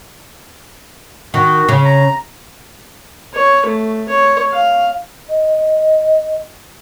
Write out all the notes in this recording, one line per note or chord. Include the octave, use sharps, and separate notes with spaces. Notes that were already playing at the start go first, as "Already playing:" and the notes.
D#3 F#4
C#3
A#5
C#5
A3
C#5
F5
D#5